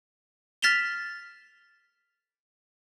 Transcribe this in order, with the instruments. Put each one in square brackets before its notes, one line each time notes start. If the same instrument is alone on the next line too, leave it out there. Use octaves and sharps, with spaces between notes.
[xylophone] F6 A6 B6 E7 F7 G7